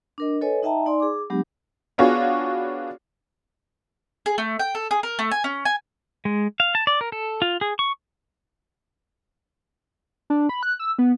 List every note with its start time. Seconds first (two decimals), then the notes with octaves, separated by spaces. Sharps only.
0.18 D4 A#4 D#5
0.41 A4 B4 C#5 D#5 G#5
0.63 D#4 D#5 E5 G5 A5 A#5
0.86 D#4 D5 G#5 C6
1.00 G#4 D6
1.30 F#3 G#3 B3 D4 G4
1.98 B3 D4 F4 F#4 G#4 C#5
4.26 G#4
4.38 A3
4.59 G5
4.75 A4
4.91 G#4
5.03 A#4
5.19 A3
5.31 G#5
5.44 C#4
5.65 G#5
6.25 G#3
6.60 F5
6.75 A5
6.87 D5
7.01 A#4
7.12 A4
7.42 F4
7.61 G#4
7.79 C#6
10.30 D4
10.49 B5
10.63 F#6
10.79 E6
10.99 B3